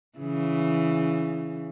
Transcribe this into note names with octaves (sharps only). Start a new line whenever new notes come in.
C#3 E3